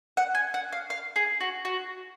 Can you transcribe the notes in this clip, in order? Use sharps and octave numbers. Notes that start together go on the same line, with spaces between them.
F#5
G#5
F#5
F5
F5
G#4
F#4
F#4